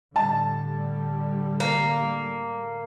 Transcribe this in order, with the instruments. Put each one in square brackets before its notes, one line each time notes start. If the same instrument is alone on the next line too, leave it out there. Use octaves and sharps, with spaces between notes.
[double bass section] A2 D3 G3 [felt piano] A5
[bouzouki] A#3